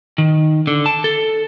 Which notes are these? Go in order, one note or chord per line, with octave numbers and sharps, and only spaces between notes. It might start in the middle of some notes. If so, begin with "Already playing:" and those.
D#3
D3
A5
A4